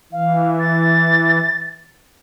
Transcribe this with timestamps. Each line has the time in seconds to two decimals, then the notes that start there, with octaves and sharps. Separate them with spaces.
0.12 E3 F5
0.59 A6